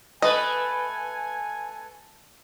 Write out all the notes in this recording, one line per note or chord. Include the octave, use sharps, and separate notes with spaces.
A3 B4 D#5 G#5